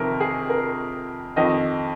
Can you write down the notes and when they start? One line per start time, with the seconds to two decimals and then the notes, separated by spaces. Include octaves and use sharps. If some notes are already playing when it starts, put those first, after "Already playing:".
Already playing: F2 C3 D#3 A#4
0.20 G#4
0.49 A#4
1.36 F2 D#3 D#5